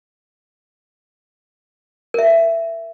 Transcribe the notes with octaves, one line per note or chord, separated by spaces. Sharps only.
A#4 E5